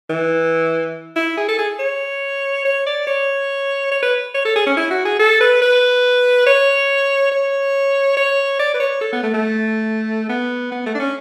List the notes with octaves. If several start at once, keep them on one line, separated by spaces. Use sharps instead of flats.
E3
E4
G#4
A4
G#4
C#5
C#5
D5
C#5
C#5
B4
C#5
A4
G#4
C#4
E4
F#4
G#4
A4
B4
B4
C#5
C#5
C#5
D5
B4
C#5
A4
B3
A3
A3
B3
B3
A3
D4
C#4